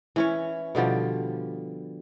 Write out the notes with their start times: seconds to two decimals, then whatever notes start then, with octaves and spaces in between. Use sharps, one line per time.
0.16 E3 C#4 C#5
0.75 B2 D3 F3 G3